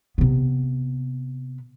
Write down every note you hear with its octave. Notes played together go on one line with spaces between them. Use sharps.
C3 B3